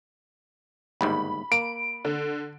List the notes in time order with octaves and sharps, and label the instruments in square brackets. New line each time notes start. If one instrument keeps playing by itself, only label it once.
[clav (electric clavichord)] G1 D#2 G#2 [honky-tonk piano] B5
[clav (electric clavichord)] A#3 [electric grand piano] D7
[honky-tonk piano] D3